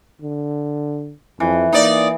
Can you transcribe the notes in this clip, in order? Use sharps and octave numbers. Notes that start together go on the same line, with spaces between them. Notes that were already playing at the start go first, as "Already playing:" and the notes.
D3
F2 E3
A#3 D#4 D5